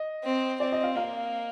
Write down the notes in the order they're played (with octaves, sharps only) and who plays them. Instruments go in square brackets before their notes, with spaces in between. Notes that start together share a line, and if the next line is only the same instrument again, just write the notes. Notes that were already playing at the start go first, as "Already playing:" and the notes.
Already playing: [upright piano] D#5
[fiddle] C4
[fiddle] C4 [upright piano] D5
[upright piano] D#5
F5
[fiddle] A#3 [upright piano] F5